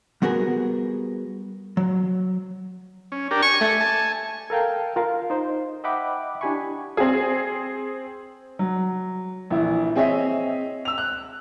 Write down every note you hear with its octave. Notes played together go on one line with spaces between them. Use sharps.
G3 B3 F#4 G#4 A#4
F#3
C#4
D4 G4 A#4
G#5 C#6
A3
A5
A4 A#4 F5 G5
F4 A#4 F5
D#4 C5
D#5 E5 F#5 G5 B5 D6
D4 E4 G4 G#5 B5 C#6
C4 G#4
F#3
A#1 E3 E4
C4 G#4 C#5 D#5 E5
E6 F7
F#6